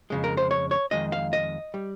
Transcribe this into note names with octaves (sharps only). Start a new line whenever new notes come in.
F2 C#3 G#3
A#4
C5
C#5
C#5
F2 D#3 G#3 D#5
F5
D#5
G3